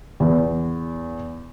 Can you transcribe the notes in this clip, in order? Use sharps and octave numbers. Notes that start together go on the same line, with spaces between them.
E2